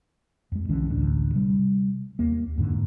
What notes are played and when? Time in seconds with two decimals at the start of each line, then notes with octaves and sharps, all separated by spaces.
0.52 F2 G#3
0.69 B1 D3 E3 C#4
0.88 A1 D2 A3 D4
1.33 C3 G3
2.19 D#2 A#3
2.58 F2 G#2 D3 A#3